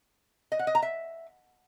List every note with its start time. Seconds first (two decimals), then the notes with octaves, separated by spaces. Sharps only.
0.52 D#5
0.59 F#5
0.67 D#5
0.75 A#5
0.82 E5